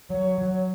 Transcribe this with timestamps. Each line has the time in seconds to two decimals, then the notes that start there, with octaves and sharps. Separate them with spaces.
0.09 F#3 C#5
0.38 F#3